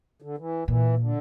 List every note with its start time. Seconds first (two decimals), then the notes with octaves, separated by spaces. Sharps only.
0.22 D3
0.38 E3
0.68 A#2 E3
0.99 D3